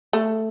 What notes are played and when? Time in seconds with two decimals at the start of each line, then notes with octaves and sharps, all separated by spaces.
0.13 A3